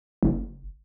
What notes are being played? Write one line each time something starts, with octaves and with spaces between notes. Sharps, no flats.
F#1